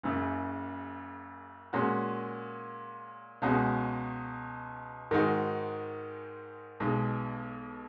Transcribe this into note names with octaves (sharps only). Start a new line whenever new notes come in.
F#1 F#2 C#3
A#2 G#3 C#4 F#4
C#2 B2 G#3 C#4 F#4
G#2 D#3 G#3 D#4 F#4
B1 B2 G#3